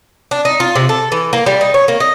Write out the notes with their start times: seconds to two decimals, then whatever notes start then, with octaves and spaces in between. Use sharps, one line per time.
0.31 D4
0.45 D#4
0.60 F4
0.75 C3
0.89 A4
1.12 E3
1.33 A#3
1.46 G3
1.61 D#4
1.74 C#5
1.88 A#3
2.00 D#5